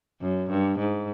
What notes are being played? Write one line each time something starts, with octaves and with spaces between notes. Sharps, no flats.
F#2
G2
G#2